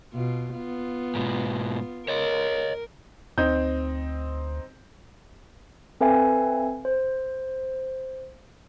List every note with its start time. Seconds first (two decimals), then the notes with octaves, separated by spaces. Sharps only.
0.13 B2 F4
0.55 B3 F4
1.15 G#2 B2
2.08 A#4 C#5 D#5
3.38 D2 C4 D#4 G6
6.01 C4 A4 B4 E5 F5 G#5
6.85 C5